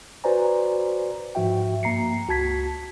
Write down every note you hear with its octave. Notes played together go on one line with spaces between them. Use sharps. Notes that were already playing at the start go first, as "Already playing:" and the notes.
F#4 B4 C5 D5 G#5 A#5
G#2 F3 F#4 E5 G5
G2 A#3 A#5 C7 C#7
C#2 F#4 A5 G#6 B6